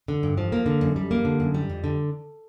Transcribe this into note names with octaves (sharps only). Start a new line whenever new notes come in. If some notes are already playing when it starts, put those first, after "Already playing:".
D3
G2
F3
A#3
D3
F#2
G3
A#3
D3
F#2
G3
F2
D3